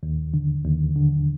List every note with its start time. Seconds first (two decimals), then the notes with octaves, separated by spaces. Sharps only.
0.03 D#2
0.34 D3
0.65 D#2
0.95 D3